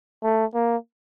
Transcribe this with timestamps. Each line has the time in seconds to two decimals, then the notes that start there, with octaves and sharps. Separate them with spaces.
0.23 A3
0.54 A#3